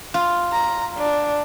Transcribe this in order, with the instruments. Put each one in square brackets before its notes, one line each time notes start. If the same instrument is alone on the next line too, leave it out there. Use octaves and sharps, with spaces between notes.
[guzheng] F4
[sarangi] A#5
D4